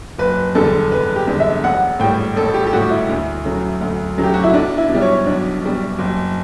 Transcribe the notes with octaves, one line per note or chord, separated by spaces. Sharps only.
F#1 B4
E2 D3 G3 A4
F#1 B4
G4
E2 D3 G3
E5
A1 F#5
A2 G3 G5
A1 A4
G4
G4
A2 G3 F#4
E4
D2
C#3 F#3 A3
D2
C#3 F#3 A3
G4
F#4
E4
B1 D4
E4
B2
G3
C#5
B1 D4
B2 G3
F#1